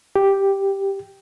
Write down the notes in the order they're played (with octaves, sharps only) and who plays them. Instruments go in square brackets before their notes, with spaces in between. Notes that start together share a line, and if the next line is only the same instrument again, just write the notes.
[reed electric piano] G4